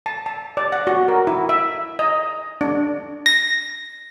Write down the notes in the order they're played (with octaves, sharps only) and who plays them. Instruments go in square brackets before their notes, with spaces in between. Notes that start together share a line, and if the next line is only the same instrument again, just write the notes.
[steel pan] A5
A5
D5
F#5
F#4
A#4
E4
E5
D#5
D4
[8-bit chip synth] A#6